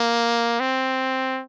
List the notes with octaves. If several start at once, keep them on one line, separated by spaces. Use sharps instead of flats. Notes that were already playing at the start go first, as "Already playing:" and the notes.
Already playing: A#3
C4